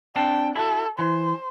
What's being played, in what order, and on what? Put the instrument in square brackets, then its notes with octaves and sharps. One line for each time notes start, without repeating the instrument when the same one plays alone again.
[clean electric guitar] C4 D4 A5 [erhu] G5
[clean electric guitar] E4 F#4 [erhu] A4
[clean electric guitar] E3 [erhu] C5